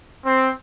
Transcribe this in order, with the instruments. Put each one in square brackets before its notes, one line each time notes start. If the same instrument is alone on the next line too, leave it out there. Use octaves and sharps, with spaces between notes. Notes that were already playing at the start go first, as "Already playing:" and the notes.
[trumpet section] C4